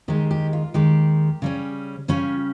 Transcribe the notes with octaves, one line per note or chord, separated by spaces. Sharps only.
D#2 D#3 G#3 G4
G4
F4
D#2 D#3 G#3 G4
C#3 G3 C#4
C#3 G3 C#4 F4